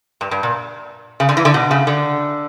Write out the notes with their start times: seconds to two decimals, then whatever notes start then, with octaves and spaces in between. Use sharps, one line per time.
0.21 G2
0.31 G2
0.43 A#2
1.20 C#3
1.29 D3
1.37 E3
1.45 D3
1.54 B2
1.71 C#3
1.87 D3